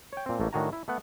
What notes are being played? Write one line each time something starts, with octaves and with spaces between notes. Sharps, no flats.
C#5 G5
A#2 C4
A1 A3 A#3
A2 D#3 D4 F#4 G#5 A#5
E4
A3 B3 F#5